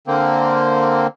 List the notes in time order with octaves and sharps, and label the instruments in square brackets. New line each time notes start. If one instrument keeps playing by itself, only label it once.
[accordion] D3 A#3 C4